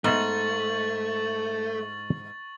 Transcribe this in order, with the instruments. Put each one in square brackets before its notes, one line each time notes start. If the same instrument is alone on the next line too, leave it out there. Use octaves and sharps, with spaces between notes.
[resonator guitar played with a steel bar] G#2 [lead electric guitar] A3 [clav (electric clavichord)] B3 D#5 E5 [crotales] C#6 A6 F#7